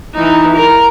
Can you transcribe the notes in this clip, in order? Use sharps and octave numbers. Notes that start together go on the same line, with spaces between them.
E3 D#4
A#4